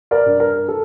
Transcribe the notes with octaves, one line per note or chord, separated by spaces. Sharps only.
A#4 D5
G2
A#4
A4